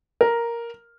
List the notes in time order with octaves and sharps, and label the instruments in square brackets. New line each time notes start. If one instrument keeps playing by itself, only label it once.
[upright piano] A#4